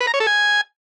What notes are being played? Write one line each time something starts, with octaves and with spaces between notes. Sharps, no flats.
B4
A#5
C#5
A4
G#5